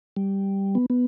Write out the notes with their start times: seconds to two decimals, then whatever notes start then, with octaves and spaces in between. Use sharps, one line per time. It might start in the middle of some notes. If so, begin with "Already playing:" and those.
0.17 G3
0.75 B3
0.90 B3